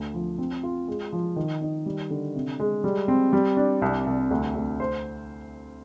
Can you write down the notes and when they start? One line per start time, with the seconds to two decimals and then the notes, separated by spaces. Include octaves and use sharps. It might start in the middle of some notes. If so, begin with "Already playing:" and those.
Already playing: D2
0.14 F3
0.38 C4
0.63 F4
0.88 G#3
1.13 F3
1.36 D#3
1.61 D#4
1.86 G3
2.10 D3
2.35 C3
2.60 G#3
2.84 G3
3.08 C4
3.33 G3
3.57 D4
3.82 C2
4.06 C2
4.31 D2
4.55 D2
4.80 C5